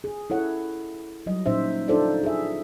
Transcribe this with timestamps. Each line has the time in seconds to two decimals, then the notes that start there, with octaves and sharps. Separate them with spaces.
0.04 G#4
0.30 E4 A4 C#5 F#5
1.26 F#3 G3 D#5
1.46 A#2 C#4 D#4 C5 E5
1.88 D4 D#4 F4 A4 C5 D5
2.23 G#4 E5